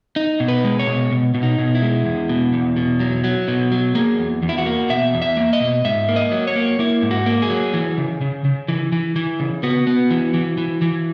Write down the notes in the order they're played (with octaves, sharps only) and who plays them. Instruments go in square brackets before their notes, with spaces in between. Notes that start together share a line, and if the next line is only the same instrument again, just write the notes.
[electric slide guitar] D#4
B2
B4
G#3
C#5
B2
B2
B2
D#4
B2
E4
G#3
E2
B2
E2
B2
F#3
F#3
B2
F#3
A#3 G#4
E2
E2
E4
F#4
A#3
B2 E5
E2
E5
A#3
D#5
B2
G#2 E5
A#3
D#5
F#3
C#5
A#3
A#3 E4
G#2
F#4
A#3
G#4
F#3
E3
C#3
C#3
C#3
E3
E3
E3
C#3
B3 F#4
B3
E3
E3
E3
E3